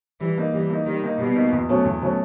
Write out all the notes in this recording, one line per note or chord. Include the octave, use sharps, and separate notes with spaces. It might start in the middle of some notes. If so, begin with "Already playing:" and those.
E3 G3
A#3 D#4
E3 G3
A#3 D#4
D#3 G3
A#3 D#4
B2 G3
A#3 D#4
E2
B2 F#3 A3 C#4
E2
B2 F#3 A3 C#4